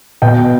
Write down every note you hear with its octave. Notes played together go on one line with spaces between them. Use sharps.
B2 G5